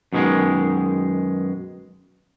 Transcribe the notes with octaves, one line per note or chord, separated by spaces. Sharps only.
F#2 B2 D#3 G#3